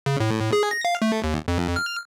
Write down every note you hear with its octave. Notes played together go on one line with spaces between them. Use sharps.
C#3
A2
G#4
A#6
F5
A3
D#2
F2
F6